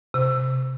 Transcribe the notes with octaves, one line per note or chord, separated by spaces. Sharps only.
C3